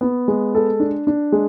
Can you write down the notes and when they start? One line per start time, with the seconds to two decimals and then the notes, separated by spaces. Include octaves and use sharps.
0.01 B3
0.28 G#3
0.55 A4
0.80 D4
1.07 D4
1.32 G#3